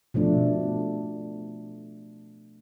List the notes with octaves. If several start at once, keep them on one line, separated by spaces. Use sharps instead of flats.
B2 F3 A3 D4